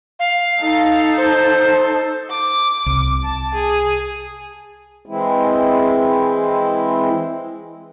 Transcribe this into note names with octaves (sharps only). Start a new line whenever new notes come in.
F5
D#4 A4
C5
D6
C2
A5
G#4
E3 G#3 C4 E4